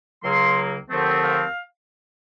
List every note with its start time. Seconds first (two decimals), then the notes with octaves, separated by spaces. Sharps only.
0.23 C#2 C#3 F#3 A#3 C6
0.90 D#2 D3 F3 A3 C4
1.23 F5